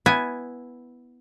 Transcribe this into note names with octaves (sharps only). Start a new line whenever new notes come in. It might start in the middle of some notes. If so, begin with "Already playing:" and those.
B3 E4 G#5